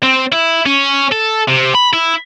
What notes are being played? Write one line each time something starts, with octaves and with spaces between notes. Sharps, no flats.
C4
E4
C#4
A4
C3
B5
E4